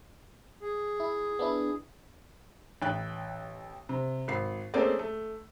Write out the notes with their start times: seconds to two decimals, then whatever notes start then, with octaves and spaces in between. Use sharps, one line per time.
0.61 G#4
1.00 E4
1.39 B3 D4 E4
2.82 A1 G5 F#6
3.89 C3
4.28 G#1 C7
4.74 A3 A#3 C4 C#4 G#4 D5
4.99 A3